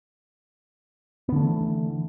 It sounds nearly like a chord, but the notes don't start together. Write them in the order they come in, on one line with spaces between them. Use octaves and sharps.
B3 D3 A3 E3